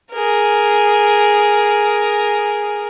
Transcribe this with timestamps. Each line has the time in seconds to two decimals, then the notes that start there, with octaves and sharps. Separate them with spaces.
0.12 G#4 A#4